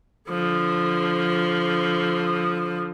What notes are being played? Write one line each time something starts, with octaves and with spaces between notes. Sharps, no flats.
D3 F3